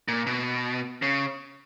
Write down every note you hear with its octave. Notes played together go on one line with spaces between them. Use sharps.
A#2
B2
C#3